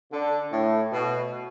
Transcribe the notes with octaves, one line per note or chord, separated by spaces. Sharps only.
D3
A2
B2